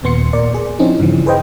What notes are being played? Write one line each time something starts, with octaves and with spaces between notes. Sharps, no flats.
D#2 A#2 B3 C6 C#7
A#2 A#4 D5
G#4
F3 C4 C#4 D#4 E4
G2 C#3 E3 F3
G#4 B4 C5 D#5 G5